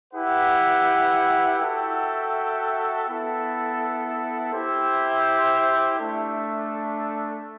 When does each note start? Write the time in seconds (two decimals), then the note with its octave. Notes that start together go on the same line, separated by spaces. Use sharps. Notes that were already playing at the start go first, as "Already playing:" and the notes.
0.13 E4 G4 B4 F#5
1.59 F#4 A4 E5 G5
3.05 B3 E4 A4
4.53 E4 G4 C5 E5
5.99 A3 D4 A4